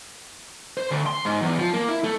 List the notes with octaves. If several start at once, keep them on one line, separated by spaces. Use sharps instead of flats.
C5
D2
C6
G#2
E2
F3
A#3
E4
A3